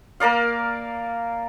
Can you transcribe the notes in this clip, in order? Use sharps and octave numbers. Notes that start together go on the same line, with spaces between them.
A#3 A#4 D5 F5